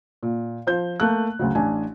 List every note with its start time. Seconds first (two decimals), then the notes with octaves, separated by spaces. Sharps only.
0.23 A#2
0.67 F3 C5 G6
1.00 A3 A#3 F#6
1.39 D2 C#3 F#3
1.55 A1 D4 G#5